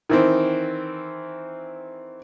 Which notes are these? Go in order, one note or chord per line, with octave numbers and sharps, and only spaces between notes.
D#3 E3 C4